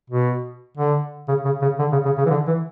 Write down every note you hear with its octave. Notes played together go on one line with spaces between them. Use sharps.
B2
D3
C#3
C#3
C#3
D3
C#3
C#3
C#3
E3
D3
E3